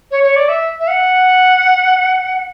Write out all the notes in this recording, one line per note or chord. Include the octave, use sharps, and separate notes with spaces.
C#5
C#5
D5
E5
E5
F#5